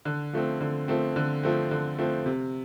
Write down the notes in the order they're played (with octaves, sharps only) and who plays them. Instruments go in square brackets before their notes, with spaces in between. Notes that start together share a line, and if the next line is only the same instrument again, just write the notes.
[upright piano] D3
F3 A3 C4
D3
F3 A3 C4
D3
F3 A3 C4
D3
F3 A3 C4
C3